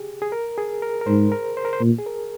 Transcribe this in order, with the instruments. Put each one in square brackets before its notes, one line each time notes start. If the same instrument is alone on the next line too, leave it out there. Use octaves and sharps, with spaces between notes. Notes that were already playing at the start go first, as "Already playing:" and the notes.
Already playing: [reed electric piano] G4 G#4
G#4
A#4
G#4
A#4
A#4
[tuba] G#2 [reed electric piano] C5
[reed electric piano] A#4
C5
A#4
C5
[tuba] A#2
[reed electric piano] G#4
A#4